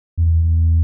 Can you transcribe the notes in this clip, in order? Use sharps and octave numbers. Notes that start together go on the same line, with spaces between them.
E2